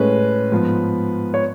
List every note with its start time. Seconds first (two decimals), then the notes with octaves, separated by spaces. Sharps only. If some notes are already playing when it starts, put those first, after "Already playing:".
Already playing: A2 G#3 C#4 B4
0.52 G#2 F3 B3
1.34 C#5